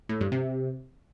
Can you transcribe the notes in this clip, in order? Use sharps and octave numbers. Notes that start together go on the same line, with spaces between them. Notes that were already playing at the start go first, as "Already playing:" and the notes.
A2
G2
C3